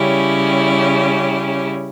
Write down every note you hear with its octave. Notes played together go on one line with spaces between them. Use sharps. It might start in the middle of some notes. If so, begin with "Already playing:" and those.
Already playing: C#3 G3 C#4 E4 G4